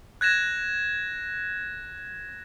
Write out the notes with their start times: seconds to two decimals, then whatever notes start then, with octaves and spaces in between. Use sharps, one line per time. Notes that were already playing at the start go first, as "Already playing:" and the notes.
0.21 F#6 G#6 A#6 E7